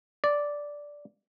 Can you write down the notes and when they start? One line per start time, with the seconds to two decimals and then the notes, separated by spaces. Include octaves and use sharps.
0.24 D5